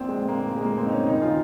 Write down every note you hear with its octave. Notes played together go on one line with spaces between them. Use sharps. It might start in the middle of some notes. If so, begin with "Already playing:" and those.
Already playing: A#1 A#2 C4
G#3
A#3
G#3
A#3
C4
D#4
C#4
D#2 C#3 D#4
F4